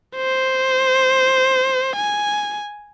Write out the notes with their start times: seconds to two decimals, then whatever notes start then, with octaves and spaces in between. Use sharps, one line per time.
0.16 C5
1.97 G#5